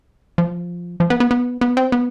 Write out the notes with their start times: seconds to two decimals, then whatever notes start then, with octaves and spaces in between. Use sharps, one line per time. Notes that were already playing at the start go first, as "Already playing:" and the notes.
0.38 F3
1.00 F3
1.10 B3
1.20 B3
1.31 B3
1.61 B3
1.77 C4
1.92 B3